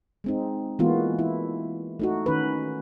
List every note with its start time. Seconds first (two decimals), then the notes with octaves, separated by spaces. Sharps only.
0.24 G#3 C4 D#4
0.79 E3 G#3 A#3 B3 F4 F#4
1.19 E4
2.00 A3 D#4 F#4
2.26 D#3 C#4 B4